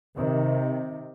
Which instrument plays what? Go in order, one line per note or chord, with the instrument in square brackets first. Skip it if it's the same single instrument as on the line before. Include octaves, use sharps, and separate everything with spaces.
[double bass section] C3 D#3